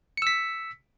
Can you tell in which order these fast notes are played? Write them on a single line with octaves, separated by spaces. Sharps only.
C#7 E6 B6